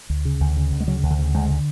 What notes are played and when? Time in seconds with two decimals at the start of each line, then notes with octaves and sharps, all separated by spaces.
0.10 D2
0.25 C#3
0.41 D2
0.57 C#3
0.72 D2
0.80 G#3
0.87 C#3 F#3
1.03 D2
1.11 D3
1.19 C#3
1.34 D2 G#3
1.50 D3